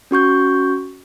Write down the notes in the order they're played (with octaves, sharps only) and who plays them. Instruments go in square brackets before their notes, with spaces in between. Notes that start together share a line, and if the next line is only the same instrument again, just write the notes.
[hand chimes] C#4 F#4 C#6 G6